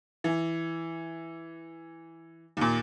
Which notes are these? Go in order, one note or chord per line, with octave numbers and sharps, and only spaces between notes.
E3
D#2 A#2